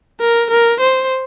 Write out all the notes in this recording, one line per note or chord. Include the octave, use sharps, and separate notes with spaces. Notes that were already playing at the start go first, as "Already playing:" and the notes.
A#4
A#4
C5